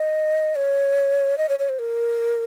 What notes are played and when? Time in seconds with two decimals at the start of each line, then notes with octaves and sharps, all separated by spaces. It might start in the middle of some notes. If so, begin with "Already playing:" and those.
Already playing: D#5
0.55 C#5
1.38 D#5
1.49 C#5
1.59 C#5
1.69 C5
1.79 A#4